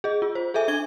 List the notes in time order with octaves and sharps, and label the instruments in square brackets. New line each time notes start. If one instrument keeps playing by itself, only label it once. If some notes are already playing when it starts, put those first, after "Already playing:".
[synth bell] G#4 D#5
F4
C5
G#4 A4 E5 G#5
D4 E5 G#6 G7